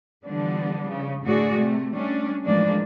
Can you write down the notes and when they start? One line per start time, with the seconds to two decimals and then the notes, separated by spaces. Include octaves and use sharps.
0.25 D3 E3 F3 G3 B3 D4
0.87 C#3
1.22 A2 D3 A3 F#4 G#4 D5
1.54 C3 A3
1.93 G3 A3 C#4 D4
2.44 A2 E3 F3 G#3 A#3 D4